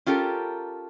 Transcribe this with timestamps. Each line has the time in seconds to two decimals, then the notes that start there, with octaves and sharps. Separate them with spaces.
0.06 C#4 F4 G4 A4 A#4